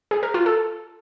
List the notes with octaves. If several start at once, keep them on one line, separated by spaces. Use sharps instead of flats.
G#4
A#4
F4
A4